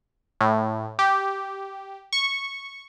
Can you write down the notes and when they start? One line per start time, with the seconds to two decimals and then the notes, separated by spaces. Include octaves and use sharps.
0.41 A2
0.99 G4
2.13 C#6